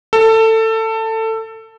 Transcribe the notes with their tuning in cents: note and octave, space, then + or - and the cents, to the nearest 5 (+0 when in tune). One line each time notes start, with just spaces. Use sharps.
A4 +20